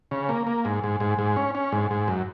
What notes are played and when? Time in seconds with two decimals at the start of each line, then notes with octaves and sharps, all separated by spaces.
0.11 C#3
0.29 A#3
0.47 A#3
0.65 G#2
0.84 G#2
1.00 G#2
1.19 G#2
1.36 C#4
1.55 C#4
1.72 G#2
1.91 G#2
2.08 F#2